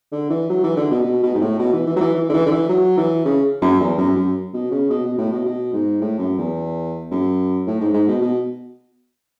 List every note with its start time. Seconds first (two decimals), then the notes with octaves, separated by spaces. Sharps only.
0.12 D3
0.30 E3
0.49 F#3
0.63 E3
0.77 D3
0.91 B2
1.04 B2
1.23 B2
1.35 G#2
1.41 A2
1.59 B2
1.73 E3
1.87 E3
1.96 F#3
2.00 E3
2.15 E3
2.29 D3
2.33 E3
2.46 D3
2.51 E3
2.69 F#3
2.97 E3
3.25 C#3
3.61 F#2
3.80 E2
3.98 F#2
4.16 F#2
4.53 B2
4.71 C#3
4.90 B2
5.05 B2
5.18 A2
5.32 B2
5.45 B2
5.73 G#2
6.01 A2
6.19 F#2
6.38 E2
7.11 F#2
7.67 A2
7.80 G#2
7.93 G#2
8.08 B2
8.21 B2